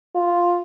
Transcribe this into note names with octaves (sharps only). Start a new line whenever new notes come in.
F4